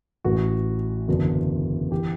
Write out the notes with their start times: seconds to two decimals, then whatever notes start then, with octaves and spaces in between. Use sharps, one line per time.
0.25 A1 A2 E3 F#4
1.08 F#1 E2 D3 F#3
1.91 E3 G4